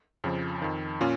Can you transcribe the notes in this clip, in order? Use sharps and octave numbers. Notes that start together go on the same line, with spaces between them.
F2 C#3 F3
F2 D#3
A#2 C#4 F4